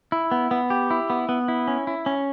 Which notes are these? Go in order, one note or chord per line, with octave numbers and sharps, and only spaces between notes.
E4
B3
B3
G4
E4
B3
B3
E4
C#4
E4
C#4